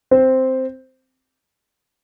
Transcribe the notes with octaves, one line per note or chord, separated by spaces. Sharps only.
C4 C5